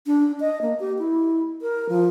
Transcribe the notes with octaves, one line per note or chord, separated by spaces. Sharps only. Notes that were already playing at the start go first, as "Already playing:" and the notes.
D4
D#5
A#3
G4
E4
A#4
F3